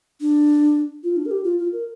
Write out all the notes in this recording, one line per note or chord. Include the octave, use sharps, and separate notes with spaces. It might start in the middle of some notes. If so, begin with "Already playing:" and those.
D4
F4
D4
A#4
G4
F4
F4
A#4